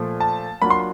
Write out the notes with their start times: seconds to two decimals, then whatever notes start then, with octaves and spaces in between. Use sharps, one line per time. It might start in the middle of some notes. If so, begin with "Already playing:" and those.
Already playing: A#2 F3 A3
0.20 A5
0.62 F#3 A#3 D4 F4 B5
0.70 C6